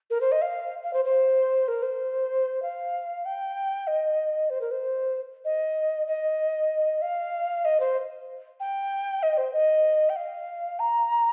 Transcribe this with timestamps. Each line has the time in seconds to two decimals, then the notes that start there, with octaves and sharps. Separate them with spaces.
0.10 A#4
0.21 C5
0.32 D#5
0.41 F5
0.83 F5
0.93 C5
1.05 C5
1.68 A#4
1.82 C5
2.62 F5
3.25 G5
3.87 D#5
4.50 C5
4.61 A#4
4.71 C5
5.45 D#5
6.07 D#5
7.02 F5
7.65 D#5
7.80 C5
8.60 G5
9.23 D#5
9.37 C5
9.53 D#5
10.09 G5
10.16 F5
10.79 A#5